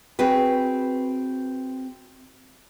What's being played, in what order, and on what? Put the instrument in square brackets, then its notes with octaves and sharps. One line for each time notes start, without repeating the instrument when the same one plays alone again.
[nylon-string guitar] C4 F#4 G#4 B4